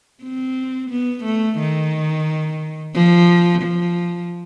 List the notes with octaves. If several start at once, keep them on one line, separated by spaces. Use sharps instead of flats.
C4
B3
A3
D#3
F3
F3